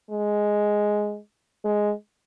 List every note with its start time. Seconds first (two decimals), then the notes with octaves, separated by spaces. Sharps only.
0.10 G#3
1.65 G#3